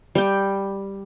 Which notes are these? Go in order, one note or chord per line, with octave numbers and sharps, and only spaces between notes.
G3 G5